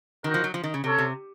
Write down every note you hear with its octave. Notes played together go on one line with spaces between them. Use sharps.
D#3 D#4 F#4 A#4
F3
F#3
F3
D#3
C#3
C3 C#4 A4 C#5
C3